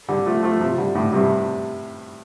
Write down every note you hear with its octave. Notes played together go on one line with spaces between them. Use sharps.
D3 G3
F3 A3
F3 A3
C3 F3
D3 G3
A2 D3
G2 C3